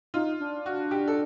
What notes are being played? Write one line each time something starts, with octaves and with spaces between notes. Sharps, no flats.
D#4 F4
D4
F#4
G4
A4